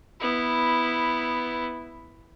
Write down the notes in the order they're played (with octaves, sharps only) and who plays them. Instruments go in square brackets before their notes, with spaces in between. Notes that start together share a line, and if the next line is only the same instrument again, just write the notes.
[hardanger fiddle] B3 E4